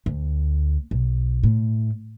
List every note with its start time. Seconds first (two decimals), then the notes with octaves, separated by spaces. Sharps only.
0.06 D2
0.91 B1
1.43 A2